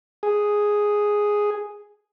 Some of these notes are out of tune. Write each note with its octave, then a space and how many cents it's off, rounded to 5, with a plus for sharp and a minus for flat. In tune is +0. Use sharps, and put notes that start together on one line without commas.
G#4 +0